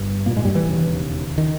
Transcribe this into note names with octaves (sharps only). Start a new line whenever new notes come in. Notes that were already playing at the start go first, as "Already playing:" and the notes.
Already playing: G1 G2
A#2 A#3
G#2 G#3
G2 G3
E3
E1 D#2 C#3
D#3